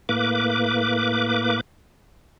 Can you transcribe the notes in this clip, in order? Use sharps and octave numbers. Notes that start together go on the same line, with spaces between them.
A2 A#3 B4 D6